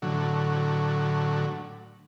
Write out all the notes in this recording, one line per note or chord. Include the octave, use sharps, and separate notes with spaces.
A2 D3 F#3